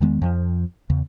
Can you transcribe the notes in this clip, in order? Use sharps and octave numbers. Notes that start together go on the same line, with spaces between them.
E2 D#3 G#3 B3
F2 F3
E2 C#3